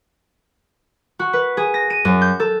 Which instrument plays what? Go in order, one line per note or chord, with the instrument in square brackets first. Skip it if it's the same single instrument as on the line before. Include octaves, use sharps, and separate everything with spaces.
[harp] F#4
B4
G#4
A#6
D#7
F#2
G6
A4